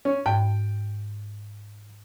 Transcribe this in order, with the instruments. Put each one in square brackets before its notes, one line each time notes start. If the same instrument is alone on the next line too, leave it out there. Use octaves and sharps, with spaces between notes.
[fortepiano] C#4
[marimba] G#2 [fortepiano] G5